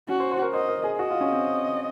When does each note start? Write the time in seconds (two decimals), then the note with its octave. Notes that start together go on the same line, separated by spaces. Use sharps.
0.08 C#4 F#4
0.20 C5
0.32 C5
0.42 A#4
0.53 C5 D#5
0.68 A#4
0.84 G#4
0.98 F#4 D#5
1.10 F4
1.21 C#4
1.33 C4